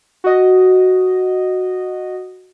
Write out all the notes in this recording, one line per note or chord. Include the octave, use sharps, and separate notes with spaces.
F#4 D#5